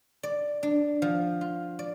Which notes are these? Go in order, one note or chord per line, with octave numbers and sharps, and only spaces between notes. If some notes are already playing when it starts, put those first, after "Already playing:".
D5
D4
F3
F4
D5